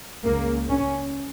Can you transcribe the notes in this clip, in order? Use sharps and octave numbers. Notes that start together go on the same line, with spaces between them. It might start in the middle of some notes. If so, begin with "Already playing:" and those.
C#2 C#3 A#3
C#4